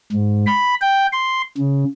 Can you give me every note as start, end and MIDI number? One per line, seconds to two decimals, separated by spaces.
0.12 0.45 44
0.46 0.75 83
0.81 1.07 79
1.13 1.42 84
1.58 1.85 49